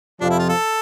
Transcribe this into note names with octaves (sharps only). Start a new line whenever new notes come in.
F2 C3 F3 D4
E4
F4
A4